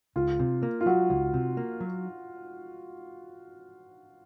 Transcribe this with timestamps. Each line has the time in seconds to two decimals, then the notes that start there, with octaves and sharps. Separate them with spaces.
0.16 C#2 F4
0.39 C3
0.63 A#3
0.81 F4
0.86 F#3 F#4
1.10 C#2
1.34 C3
1.57 A#3
1.81 F#3